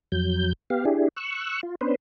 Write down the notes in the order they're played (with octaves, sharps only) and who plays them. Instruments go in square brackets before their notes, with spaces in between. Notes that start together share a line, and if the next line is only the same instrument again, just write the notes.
[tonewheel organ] F2 F#3 G6
B3 G4 F5
D4 E4 G4 G#4
C#6 E6 F#6
F4
B3 C#4 D4 B4 C5